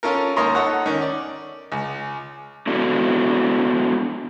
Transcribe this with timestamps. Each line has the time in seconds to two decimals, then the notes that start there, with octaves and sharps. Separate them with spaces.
0.03 C#4 F4 A4 A#4
0.36 D#2 A#4 C#5 A#5 C6 D#6
0.55 D#4 A4 C#5 F#5
0.86 D#3 C#4
1.02 D5
1.72 C#2
2.67 B3 D4 E4 F#4 A4